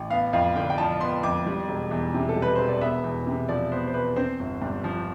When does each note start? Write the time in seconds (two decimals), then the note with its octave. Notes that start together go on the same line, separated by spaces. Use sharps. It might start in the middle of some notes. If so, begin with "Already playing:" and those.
Already playing: A1
0.10 B3 F5
0.33 F2 F5
0.56 D3 G5
0.70 G5
0.78 F3 A5
1.01 B3 C6
1.23 F2 D6
1.46 G3
1.68 E1
1.91 E2
2.14 C3
2.29 A4
2.36 G3
2.42 B4
2.55 E1 C5
2.69 D5
2.81 B3 E5
3.04 E2
3.27 C3
3.49 F3 D5
3.72 B3 C5
3.87 C5
3.94 E2 B4
4.16 C4 C5
4.39 G1
4.62 G2
4.84 F3